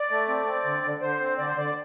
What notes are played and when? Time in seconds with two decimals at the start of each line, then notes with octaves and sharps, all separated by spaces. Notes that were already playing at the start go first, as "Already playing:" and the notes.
Already playing: D5
0.10 A3
0.28 C4
0.46 C4
0.65 D3
0.84 D3
1.01 D3 C5
1.20 C4
1.38 D3 D5
1.48 C5
1.57 D3 D5